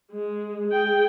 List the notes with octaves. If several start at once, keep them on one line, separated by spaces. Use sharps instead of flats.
G#3
G#4 G5